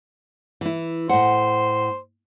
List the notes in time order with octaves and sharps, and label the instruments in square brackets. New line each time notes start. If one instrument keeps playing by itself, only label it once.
[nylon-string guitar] E3 E4
[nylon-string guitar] A2 F#5 [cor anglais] C5